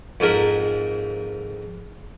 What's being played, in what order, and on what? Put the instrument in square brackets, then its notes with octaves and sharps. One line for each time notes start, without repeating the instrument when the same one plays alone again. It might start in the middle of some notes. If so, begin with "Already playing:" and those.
[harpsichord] F2 G#2 A#4 B5